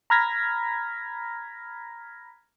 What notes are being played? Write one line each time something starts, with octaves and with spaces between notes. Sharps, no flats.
A#5 B5 F6 G#6 A#6 B6